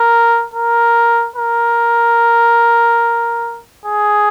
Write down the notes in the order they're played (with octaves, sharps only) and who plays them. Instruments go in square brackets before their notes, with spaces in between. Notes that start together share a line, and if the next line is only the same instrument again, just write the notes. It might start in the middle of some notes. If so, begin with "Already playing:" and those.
Already playing: [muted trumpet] A#4
A#4
A#4
G#4